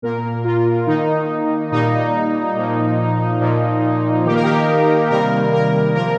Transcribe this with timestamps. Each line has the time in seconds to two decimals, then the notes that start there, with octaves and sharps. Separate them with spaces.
0.02 A#2 A#3 A#4
0.44 F4
0.87 D#3 A#3 D#4
1.72 A#2 G3 A#3 D#4
2.56 A#2 F3 A#3
3.41 A#2 F3 A#3
4.25 D#3 G4
4.30 A#3 A#4
4.43 G4
5.10 C3 D#3 G3 A#3 A#4
5.53 A#4
5.95 C3 F3 A#3 A#4